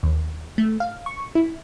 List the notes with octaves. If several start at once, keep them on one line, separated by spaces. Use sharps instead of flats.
D#2
A3
F5
C#6
E4